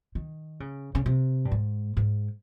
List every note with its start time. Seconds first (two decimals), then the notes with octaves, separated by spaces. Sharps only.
0.15 D#3
0.60 C#3
0.95 C#3
1.06 C3
1.45 G2
1.51 G#2
1.97 G#2